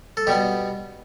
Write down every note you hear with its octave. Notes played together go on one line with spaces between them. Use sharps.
A4
B2 G3 B3 G4